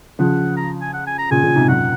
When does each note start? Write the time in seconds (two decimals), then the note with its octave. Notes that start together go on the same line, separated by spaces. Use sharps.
0.19 C#3 F3 F#5
0.57 A#5
0.82 G#5
0.94 F#5
1.07 G#5
1.18 A#5
1.31 A#2 C#3 G#5
1.43 A#2 C#3
1.56 G#2 C3
1.68 F#2 A#2 F#5